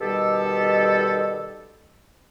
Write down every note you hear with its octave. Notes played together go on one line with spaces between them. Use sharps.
B2 D#3 G3 G4 A4